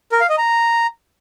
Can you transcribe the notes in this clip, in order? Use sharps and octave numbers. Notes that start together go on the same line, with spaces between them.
A#4
F5
D#5
A#5